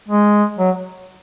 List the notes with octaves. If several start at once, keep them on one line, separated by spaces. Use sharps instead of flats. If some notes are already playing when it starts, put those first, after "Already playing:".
G#3
F#3